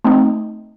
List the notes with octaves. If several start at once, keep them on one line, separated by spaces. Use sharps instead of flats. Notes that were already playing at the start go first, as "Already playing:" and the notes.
A3 C4 D#4